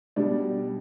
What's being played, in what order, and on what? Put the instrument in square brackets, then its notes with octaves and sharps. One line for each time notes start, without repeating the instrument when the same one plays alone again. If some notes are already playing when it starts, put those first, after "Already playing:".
[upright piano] B2 G3 D4